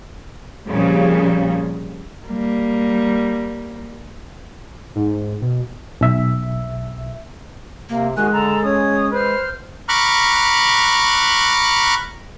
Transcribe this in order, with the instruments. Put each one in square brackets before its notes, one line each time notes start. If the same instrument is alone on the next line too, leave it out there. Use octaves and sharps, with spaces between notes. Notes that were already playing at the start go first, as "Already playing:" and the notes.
[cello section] F2 A#2 C#3 F3 G3
[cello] G3 A#3
[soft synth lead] G#2
B2
[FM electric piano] B1 E5
[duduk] C3 [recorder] A#3
[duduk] D#3 [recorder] G#3 [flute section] F#4 G#5 F#6
[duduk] D3 [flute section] A4 A5 A#5
[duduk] C#4 [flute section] C#5 D#6
[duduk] B4 [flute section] C5 F6
[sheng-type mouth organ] A#5 B5 C#6 D6 F6 F#6